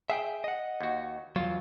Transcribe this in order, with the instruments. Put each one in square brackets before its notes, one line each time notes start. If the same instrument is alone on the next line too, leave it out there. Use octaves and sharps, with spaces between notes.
[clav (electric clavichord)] G#4 [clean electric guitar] E5 F#5 G5
[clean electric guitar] D#5 F#5
[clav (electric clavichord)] D#2 F#4
[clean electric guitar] E2 F#3 [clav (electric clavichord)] F4